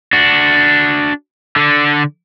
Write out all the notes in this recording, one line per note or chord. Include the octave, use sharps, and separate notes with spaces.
D4 F#4
D3 D4